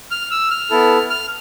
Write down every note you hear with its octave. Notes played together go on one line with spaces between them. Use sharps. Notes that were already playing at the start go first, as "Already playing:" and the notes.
F6
E6
F6
B3 E4 A4
F6